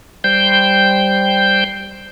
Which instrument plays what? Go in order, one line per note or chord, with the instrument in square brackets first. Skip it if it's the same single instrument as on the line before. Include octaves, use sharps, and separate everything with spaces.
[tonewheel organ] G3 C5 G5 G6